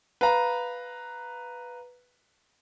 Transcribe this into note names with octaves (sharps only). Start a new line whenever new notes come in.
B4 F5 A#5